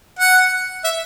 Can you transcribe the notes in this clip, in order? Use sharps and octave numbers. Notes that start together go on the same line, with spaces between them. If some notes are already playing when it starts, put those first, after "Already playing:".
F#5
E5